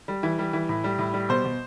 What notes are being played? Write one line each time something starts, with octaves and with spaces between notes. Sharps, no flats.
G3
E3
G3
E3
A2
G3
A2
G3
B2 C5
B2